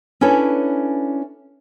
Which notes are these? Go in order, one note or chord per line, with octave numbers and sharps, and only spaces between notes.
C#4 D4 E4 A4 B4 C#5